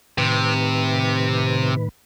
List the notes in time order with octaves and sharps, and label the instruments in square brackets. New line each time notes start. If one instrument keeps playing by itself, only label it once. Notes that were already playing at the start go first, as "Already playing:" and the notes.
[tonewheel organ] A2 D#3 B4 [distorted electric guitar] C3